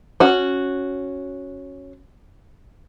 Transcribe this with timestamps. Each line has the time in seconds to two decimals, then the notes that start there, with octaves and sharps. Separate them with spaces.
0.20 C#4 F#4